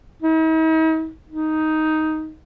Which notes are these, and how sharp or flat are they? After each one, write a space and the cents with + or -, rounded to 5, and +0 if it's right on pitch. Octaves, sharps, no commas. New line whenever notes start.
D#4 +45
D#4 +5